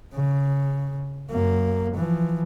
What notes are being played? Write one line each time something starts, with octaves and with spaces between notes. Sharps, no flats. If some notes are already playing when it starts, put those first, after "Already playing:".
C#3
F#2 A#3
E3 F3